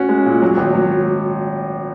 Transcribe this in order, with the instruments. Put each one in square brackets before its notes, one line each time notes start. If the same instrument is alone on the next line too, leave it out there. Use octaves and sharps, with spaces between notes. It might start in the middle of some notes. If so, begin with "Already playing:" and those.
Already playing: [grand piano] C#4 F#4
G#3
A#2
F#3
G#1
F#3